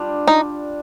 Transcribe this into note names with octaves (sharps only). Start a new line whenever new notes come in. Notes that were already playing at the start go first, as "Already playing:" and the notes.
Already playing: G3 D4 F4
D#4